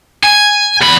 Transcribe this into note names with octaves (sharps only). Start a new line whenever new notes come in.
G#5
E2 B5